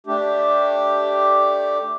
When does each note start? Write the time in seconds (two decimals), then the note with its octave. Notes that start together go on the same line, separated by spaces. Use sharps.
0.07 A3 D4 G4